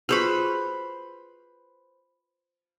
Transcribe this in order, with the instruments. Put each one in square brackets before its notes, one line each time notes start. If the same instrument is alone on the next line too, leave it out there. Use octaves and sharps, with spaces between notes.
[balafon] F4 F#4 G#4 [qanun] B4 C5 B5